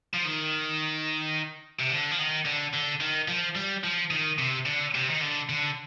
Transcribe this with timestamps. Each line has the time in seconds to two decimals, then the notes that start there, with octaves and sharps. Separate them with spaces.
0.14 F3
0.25 D#3
1.79 C3
1.90 D3
2.11 F3
2.18 D#3
2.45 D3
2.73 D3
3.01 D#3
3.28 F3
3.56 G3
3.84 F3
4.11 D#3
4.38 C3
4.66 D3
4.94 C3
5.09 D#3
5.21 D3
5.49 D3